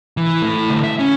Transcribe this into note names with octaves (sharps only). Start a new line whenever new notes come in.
E3
A3 E4
D3 G3
E5
C#4